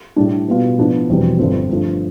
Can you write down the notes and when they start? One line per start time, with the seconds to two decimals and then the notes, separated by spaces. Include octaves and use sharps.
0.16 A2 G3 D4
0.48 B2 G3 B3 F4
0.78 A2 F3 B3 D4 F4
1.09 F1 E2 B2 G3 C4
1.39 G1 G2 D3 F3 C4
1.70 G2 F3 A3